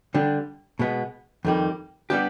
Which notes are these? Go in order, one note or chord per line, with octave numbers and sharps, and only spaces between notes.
D3 G3 D4
B2 G#3 B3
F2 D#3 G3
G3 B3 D4 G4